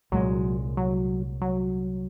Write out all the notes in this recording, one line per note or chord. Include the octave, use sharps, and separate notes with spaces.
C2 A#2 F#3 G#3
F#3
F#3